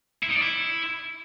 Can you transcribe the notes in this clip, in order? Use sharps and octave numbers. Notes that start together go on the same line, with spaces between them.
E4
D#4
D5
E4